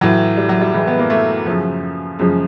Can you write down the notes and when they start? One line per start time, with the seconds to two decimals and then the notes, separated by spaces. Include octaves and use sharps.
0.01 A2 E3 F#3
0.37 G3
0.49 F#3
0.61 G3
0.74 A2 E3 G#3
0.87 B3
0.99 A#3
1.10 A3
1.46 F#2 C#3 F3
2.19 F#2 C#3 F3 G#3